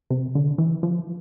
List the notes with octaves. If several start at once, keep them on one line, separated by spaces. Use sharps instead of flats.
C3
D3
E3
F3